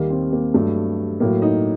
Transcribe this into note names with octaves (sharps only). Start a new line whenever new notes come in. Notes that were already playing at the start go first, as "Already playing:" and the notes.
Already playing: D#2 D#3 G3 A#3
C4
A#3
G2 F#3 A3
A2 F#3 A#3
D#4